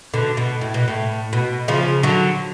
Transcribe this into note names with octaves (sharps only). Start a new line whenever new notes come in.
B2 D3
B2
A2
B2
A2
B2
C#3 F3
D3 F#3